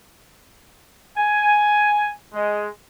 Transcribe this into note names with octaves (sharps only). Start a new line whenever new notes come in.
G#5
G#3